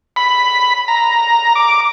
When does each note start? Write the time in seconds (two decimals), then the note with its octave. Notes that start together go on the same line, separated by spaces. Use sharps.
0.16 B5
0.88 A#5
1.55 D6